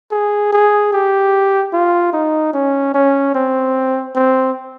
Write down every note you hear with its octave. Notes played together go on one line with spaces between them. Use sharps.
G#4
G#4
G4
F4
D#4
C#4
C#4
C4
C4